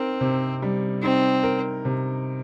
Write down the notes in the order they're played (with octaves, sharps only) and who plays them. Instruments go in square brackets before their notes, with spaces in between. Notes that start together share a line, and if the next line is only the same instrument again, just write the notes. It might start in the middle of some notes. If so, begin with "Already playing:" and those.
Already playing: [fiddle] C4 [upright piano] D#4 A#4
[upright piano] C3
G3
[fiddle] C4 [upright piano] D#4
[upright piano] A#4
C3